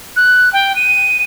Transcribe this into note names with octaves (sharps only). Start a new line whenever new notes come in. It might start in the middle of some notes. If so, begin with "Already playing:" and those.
F#6
G5
D#7